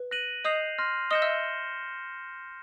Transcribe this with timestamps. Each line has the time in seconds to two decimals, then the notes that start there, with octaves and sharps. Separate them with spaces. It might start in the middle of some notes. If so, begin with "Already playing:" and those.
Already playing: B4
0.11 F#6 A#6 D#7 F#7
0.45 D#5 D#6 G6 C7 F7
0.78 C6 F6 A#6
1.11 D#5 D#6 G6 A#6 C#7 E7 G7
1.22 E5 E6